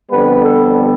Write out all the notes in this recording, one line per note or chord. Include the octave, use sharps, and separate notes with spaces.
F2 D3 G3 B3 B4
A4